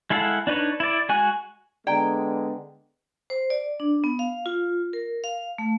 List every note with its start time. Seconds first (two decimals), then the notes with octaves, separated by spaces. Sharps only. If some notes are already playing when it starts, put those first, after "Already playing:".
0.10 G#3 E4 A4 F5 F#5
0.47 D4 D#4 B4 C#5
0.80 E4 D5
1.09 G#3 F#4 G#5 F#6
1.87 D3 G#3 B3 D5 G5 A#5
3.30 C5
3.50 D5
3.80 D4
4.04 B3
4.19 F5
4.46 F4
4.93 A#4
5.24 F5
5.58 A3